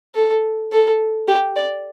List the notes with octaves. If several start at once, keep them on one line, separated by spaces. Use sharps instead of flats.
A4
A4
G4
D5